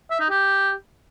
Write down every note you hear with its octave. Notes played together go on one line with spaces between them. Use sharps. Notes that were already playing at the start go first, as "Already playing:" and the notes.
E5
D#4
G4